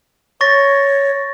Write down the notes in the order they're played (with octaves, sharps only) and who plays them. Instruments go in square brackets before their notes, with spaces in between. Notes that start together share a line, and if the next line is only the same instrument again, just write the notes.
[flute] C#5 [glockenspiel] C#6 A6 A#6